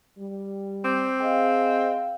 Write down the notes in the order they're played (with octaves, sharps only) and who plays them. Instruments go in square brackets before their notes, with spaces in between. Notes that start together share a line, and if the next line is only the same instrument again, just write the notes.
[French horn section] G3
[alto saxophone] C4 [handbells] D6 G6
[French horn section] G#4 D#5 [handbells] F5 G5